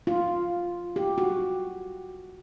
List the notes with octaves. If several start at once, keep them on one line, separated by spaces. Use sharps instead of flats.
F4
G4
F#4